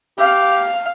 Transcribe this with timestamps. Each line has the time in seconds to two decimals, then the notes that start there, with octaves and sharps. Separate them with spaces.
0.19 G4 F5